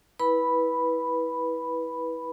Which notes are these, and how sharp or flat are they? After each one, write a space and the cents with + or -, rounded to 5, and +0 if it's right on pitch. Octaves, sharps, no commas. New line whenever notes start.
E4 -15 B4 -10 B5 +0